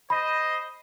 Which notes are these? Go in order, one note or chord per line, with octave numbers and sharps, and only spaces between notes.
C5 D#5 B5